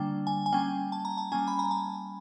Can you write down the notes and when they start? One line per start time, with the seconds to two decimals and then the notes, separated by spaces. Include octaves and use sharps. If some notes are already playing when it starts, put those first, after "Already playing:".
Already playing: D3 G3 A#3 D4 G5
0.27 G#5
0.46 G#5
0.53 G3 A#3 C#4 G5
0.92 A5
1.05 A#5
1.17 A5
1.32 G3 A#3 C#4 G#5
1.48 B5
1.59 A#5
1.71 A5